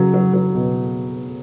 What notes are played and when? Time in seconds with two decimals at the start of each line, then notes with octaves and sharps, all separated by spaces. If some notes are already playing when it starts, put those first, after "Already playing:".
Already playing: C#3 F#3
0.14 F#3
0.33 F#3
0.55 B2